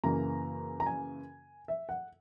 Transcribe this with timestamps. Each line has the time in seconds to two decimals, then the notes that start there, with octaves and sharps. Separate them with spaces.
0.04 F#2 C#3 E3 A#3 A#5
0.80 A#5
0.86 G#5
1.68 E5
1.89 F#5